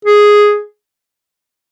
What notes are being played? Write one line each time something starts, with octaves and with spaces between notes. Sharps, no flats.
G#4